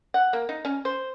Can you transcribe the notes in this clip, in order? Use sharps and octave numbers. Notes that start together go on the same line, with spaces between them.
F#5
A#3
D#4
C#4
C5